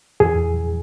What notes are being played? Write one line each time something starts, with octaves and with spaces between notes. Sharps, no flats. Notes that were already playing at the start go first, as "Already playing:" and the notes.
E2 G#4